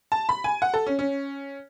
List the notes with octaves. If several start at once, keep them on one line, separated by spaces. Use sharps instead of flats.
A5
B5
G#5
F#5
A4
C#4
C#4